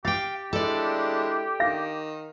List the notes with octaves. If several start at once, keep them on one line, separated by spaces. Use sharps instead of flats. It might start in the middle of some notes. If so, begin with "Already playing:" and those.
G4 F5 G5 A6
G#3 D4 E4 A4 D5
D#3 F5 A#6